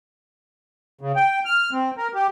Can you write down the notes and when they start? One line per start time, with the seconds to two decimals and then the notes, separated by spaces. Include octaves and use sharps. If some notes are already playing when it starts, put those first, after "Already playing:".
1.01 C#3
1.16 G5
1.45 F6
1.72 C4
1.97 A#4
2.14 G4